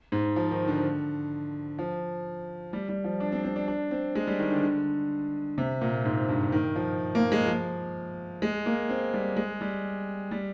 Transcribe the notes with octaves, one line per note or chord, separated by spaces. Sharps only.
G#2
F3
D#3
D3
F3
G3
G3
F3
D4
C4
C4
D4
D4
C4
G#3
G3
D#3
D3
D3
C3
A#2
G#2
G2
D#3
F3
A#3
G#3
F3
G#3
A#3
C4
G3
G#3
G3
G3